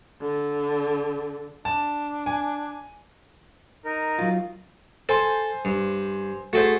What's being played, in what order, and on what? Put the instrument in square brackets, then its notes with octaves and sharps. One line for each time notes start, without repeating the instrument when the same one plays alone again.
[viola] D3
[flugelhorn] D4 [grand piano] A5
[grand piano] G#5
[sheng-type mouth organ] D#4 A#4
[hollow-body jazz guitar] F#3 F4
[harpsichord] A4 [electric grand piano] C5 G#5 C6
[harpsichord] G2
[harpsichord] A3 A4 C5 [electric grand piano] F#4 G#4